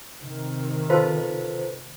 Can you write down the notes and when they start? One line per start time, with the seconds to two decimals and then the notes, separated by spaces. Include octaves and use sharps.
0.18 C3 D#3
0.90 F4 A4 B4 C5